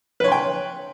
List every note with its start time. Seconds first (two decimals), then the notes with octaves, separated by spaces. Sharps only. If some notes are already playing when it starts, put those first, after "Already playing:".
0.20 B4
0.24 C#5
0.28 C6
0.32 G5